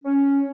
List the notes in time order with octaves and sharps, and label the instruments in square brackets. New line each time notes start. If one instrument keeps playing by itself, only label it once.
[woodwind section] C#4